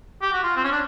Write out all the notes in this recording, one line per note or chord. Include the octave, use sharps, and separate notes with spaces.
G4
F#4
F4
C4
C#4
D4